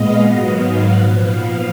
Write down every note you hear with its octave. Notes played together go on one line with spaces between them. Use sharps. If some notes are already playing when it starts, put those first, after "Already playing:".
Already playing: A#2 G#3 B3 D#5 F5
G#2 D#3 F#3 B3 F#5
F5
A#2 F3 B3 F#5
F5